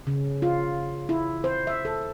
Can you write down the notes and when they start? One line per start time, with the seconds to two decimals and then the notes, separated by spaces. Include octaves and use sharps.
0.07 C#3
0.42 F4
1.09 E4
1.44 C5
1.67 E5
1.85 A4